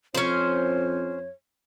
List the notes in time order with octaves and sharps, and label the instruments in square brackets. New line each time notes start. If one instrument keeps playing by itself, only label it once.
[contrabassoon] F2 [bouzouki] C#4 C5 [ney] C#5